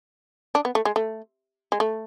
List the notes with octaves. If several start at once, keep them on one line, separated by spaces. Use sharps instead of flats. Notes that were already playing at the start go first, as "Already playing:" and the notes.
D4
B3
A3
G#3
A3
G#3
A3